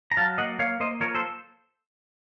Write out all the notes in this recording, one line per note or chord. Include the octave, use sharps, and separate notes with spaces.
A#5
F#3 F5 A5
A#3 D#5 F#5
A#3 C#5 F5
A#3 C5 D#5
F3 A#4 C#5
A4 C5